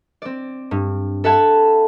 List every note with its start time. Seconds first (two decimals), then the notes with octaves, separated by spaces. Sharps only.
0.22 C4 D5
0.71 G2
1.24 A4 E5 F#5 A5 B5 G#6